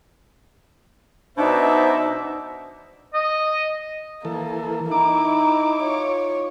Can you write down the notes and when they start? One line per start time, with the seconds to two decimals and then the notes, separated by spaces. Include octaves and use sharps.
1.38 B2 D4 D#4 C5 E5
3.14 D#5
4.25 E3 A#3 A4
4.92 D#4 E4 A#5 D6
5.83 F4 C#5